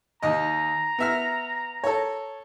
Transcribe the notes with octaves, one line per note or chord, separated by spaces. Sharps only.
D#2 D#5 A#5
B3 E5 F6
A4 C#5